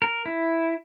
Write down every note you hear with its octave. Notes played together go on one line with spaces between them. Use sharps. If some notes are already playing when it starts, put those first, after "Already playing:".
A#4
E4